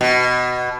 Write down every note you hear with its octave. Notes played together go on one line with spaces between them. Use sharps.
B2